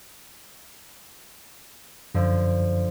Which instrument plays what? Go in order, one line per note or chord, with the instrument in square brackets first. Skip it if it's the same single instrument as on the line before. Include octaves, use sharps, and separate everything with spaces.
[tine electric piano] F#2 [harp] D3 F3